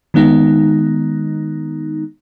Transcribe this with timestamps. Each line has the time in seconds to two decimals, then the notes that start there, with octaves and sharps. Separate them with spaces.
0.14 D#3 G#3 B3 D#4